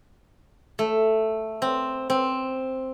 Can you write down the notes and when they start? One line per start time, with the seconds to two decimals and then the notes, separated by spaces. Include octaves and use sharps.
0.79 A3
1.62 C4
2.10 C4